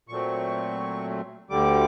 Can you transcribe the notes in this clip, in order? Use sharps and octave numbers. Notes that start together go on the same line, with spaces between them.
A#2 F#3 A3 C4 C#6
D2 D3 G3 D6